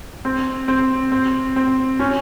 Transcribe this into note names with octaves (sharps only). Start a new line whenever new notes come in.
C4
C4
C4
C4
C#4